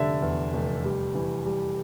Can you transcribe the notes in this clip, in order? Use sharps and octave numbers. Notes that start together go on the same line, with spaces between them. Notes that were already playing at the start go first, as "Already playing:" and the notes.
Already playing: F1 D3 G3 D5 E5
E2
F1
G3
E3
G3